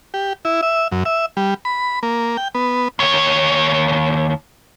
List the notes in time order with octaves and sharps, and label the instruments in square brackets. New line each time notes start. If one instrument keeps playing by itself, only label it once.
[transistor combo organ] G4
E4
E5
F#2
E5
G3
B5
A#3
G5
B3
[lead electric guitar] D#2 C#5